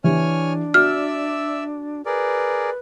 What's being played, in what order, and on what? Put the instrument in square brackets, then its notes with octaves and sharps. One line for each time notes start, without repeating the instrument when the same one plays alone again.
[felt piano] E3 G4 [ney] D4 [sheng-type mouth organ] C#5 G#5 F6
[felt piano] F#4 [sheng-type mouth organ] D5 E5 E6 [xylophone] F6
[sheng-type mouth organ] G#4 A#4 D5 [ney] B4